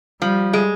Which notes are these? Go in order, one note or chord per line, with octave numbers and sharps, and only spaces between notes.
F3 G3
G#3